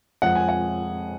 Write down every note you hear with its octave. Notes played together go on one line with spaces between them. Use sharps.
F2 F3 G#3 F#5
G#5
F#5